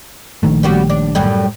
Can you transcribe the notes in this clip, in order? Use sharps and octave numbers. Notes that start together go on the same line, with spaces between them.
A#1 D#3 A3
G3 B3 F#4
D4
F#2 A2 G3